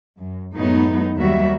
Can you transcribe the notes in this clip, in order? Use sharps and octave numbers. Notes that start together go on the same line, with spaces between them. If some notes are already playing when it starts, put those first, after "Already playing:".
F#2
F#2 A2 F#3 G#3 B3 D#4
D#2 D#3 F#3 G3 F#4 E5